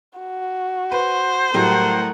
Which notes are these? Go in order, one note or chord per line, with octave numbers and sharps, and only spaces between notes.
F#4
B4 C5
A2 F#3 G3 A3 A#4 F#5